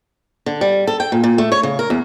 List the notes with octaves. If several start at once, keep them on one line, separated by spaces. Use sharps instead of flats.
D3
G3
A4
G5
A#2
A#2
A3
C#5
C#3
A#4
E2